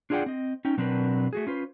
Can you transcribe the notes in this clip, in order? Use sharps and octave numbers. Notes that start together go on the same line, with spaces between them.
D4 F4 G#4 D5 F#5 G5
C4 D#5
C#4 D#4 G5
B2 F#3 C4 D4 A#4 B4
A3 F#4 G#4
C#4 F4 B4 C5